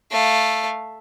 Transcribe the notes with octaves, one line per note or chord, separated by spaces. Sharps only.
A3 F5